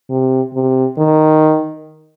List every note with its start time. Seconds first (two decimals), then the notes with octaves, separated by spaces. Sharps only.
0.10 C3
0.54 C3
0.98 D#3